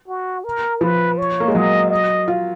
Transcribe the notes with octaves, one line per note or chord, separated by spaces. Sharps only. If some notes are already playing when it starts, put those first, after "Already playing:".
F#4
A#4
F3 B4
C#5
A#3
G#3
F#3 D#5
D#5
F4